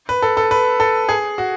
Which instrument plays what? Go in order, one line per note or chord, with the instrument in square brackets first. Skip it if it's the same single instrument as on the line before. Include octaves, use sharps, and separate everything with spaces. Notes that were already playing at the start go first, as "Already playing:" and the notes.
[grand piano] B4
A4
A4
B4
A4
G#4
F#4